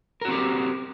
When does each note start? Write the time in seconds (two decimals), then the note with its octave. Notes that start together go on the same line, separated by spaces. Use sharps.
0.21 A#4
0.25 F#4
0.28 C4
0.32 G4